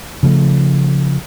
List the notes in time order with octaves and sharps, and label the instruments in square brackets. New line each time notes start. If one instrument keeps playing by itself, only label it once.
[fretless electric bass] C#3 F3 A3